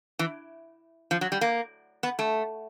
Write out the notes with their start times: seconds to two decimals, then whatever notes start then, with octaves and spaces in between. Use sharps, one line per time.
0.19 E3
1.11 F3
1.21 F#3
1.32 G3
1.41 A#3
2.03 B3
2.19 A3